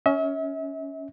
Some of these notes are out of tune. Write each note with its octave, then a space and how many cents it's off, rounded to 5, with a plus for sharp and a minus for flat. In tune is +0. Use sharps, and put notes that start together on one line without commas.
C#4 +15 E5 -40